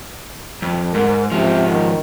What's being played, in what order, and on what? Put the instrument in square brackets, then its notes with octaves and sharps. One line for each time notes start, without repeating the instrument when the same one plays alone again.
[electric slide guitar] F2
[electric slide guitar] G#2 [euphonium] A#4
[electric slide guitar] G#2 F3 [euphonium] C3
[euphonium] D#3